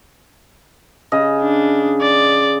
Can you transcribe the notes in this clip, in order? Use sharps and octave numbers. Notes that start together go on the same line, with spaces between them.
C#3 D#5
D4
D5